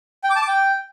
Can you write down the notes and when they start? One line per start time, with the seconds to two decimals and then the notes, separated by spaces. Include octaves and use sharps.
0.24 G5
0.30 D6
0.36 A5
0.42 D6
0.48 G5